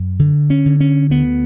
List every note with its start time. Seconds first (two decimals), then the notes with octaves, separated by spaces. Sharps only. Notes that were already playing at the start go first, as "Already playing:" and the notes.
Already playing: F#2
0.19 D3
0.50 C#4
0.66 D3
0.80 C#4
1.10 D2 B3